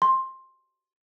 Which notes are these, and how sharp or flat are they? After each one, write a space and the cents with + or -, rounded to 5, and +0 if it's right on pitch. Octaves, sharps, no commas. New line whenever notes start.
C6 +10